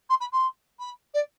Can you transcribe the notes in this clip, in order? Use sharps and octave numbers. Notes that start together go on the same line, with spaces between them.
C6
B5
C6
B5
D5